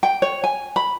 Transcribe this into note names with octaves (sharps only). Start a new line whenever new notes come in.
G5
C#5
G#5
B5